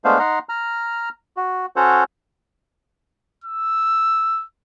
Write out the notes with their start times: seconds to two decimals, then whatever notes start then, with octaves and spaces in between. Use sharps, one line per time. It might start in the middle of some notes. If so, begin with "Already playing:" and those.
0.04 G#3 A3 B3 D4 C5 F5
0.19 D#4 F#5 A#5 C6
0.49 A#5 F6
1.37 F#4
1.76 C#4 F#4 A4 C5 C#5 F#5
3.44 E6